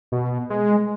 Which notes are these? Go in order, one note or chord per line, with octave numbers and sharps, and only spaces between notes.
B2
G#3